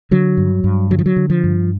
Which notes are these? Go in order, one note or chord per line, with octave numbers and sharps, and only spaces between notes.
D3 F#3
G2
G2
D3 F#3
F3
F#3
D3
F3
G2